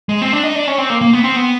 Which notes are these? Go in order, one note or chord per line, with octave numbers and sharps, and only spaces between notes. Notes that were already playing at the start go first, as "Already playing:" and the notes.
G#3
C4
D4
D#4
D4
C#4
C4
A#3
A#3
B3
C4
B3